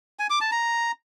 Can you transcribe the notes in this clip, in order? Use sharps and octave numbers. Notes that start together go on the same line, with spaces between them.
G#5
D6
A5
A#5